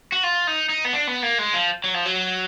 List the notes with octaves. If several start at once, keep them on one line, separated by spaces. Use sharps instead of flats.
F#4
F4
D#4
D#4
B3
D4
B3
A#3
G#3
F3
F#3
F3
F#3